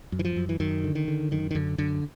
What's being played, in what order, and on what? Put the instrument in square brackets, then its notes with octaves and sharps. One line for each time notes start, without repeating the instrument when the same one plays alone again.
[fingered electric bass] F#2
E3
F3
F#2
E3
F#2 D#3
D3
D#3
D3
F#2 D#3
D#3
F#2 D3
F#2 D3